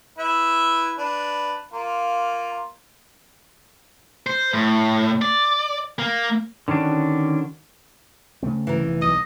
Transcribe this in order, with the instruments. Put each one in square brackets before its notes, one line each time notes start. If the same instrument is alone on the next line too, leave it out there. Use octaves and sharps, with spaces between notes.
[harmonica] E4 B4 E5
D4 B4
A#3 F4
[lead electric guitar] C5
A2
D5
A#3
[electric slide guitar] D3 D#3 C#4 D4 F#4
[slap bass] C#3 A3 C4
[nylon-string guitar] E3 A#4
[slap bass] F1 E2
[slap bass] B1 E2 [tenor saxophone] D#5